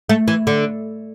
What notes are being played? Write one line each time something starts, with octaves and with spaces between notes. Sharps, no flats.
A3
E3
D3